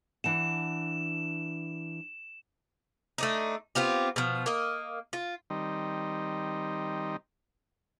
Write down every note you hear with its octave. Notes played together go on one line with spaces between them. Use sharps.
E3 D4 F#5 E7
A3 D4 D#4
B3 C4 F4 G4
B2 F3
A#3 D#5
F4
D#3 G3 C4 D#4